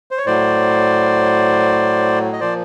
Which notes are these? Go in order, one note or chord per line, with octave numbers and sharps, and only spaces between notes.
C5
C#5
A2 F#3 C5 D5
D#5
A#2 F3 C5 D5